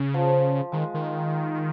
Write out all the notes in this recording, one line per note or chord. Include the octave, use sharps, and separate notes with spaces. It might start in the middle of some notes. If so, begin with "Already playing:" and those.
Already playing: C#3
F3
D#3 G#3
D#3